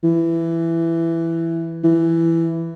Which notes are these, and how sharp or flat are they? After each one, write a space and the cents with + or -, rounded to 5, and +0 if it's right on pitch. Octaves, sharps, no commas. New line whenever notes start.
E3 +10
E3 +10